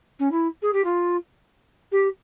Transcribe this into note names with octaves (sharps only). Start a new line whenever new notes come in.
C#4
E4
G#4
G4
F4
G4